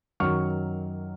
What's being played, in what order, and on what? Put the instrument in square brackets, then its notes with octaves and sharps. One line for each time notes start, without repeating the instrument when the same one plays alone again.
[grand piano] F#2 D#3 F#3 C#6 F6